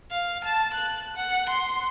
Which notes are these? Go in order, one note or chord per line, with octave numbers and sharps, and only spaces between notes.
F5
A5
F#6
F#5
C6